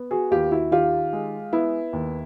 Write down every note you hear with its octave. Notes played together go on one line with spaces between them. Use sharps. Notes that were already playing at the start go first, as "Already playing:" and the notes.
Already playing: B3
F#4 G#4
D#2 F4 G4
E4 F#4
D#3 F4 G4
G#3
B3 E4
D#2